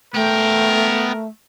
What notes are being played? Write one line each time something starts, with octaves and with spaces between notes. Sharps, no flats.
A3 B3 A#4 G5